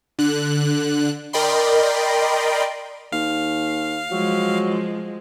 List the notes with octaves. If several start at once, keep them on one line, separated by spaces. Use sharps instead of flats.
D3 F#6
A#4 D5 D#5 G5 B5 C6
D#2 F5
F3 F#3 G#3